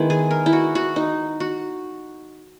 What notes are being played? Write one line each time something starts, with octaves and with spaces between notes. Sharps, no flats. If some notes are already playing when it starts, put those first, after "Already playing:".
Already playing: D#3 G#3 B3 E4
G#4
A#4
E4
F#4
F#4
D#4
F#4